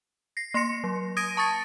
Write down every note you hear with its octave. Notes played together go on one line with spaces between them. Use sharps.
A#6 C7
A#3 C6 A#6 C#7
F#3
D#6 G#6 A#6 D7 D#7
A5 C#6 D#6 A6 C#7